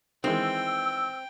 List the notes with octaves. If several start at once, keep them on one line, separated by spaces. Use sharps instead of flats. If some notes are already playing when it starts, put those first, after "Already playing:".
D#3 E3 G#3 C4 G5 E6